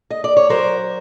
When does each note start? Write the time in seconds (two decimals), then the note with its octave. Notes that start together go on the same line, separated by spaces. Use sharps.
0.10 D#5
0.24 D5
0.37 C#5
0.49 F#3 A#4 C5